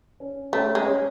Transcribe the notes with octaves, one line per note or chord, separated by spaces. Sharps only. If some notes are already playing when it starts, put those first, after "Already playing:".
C#4
A3 C#4
G#3
C#4